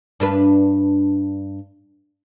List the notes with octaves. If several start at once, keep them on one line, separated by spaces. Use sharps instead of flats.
G2 D4 B4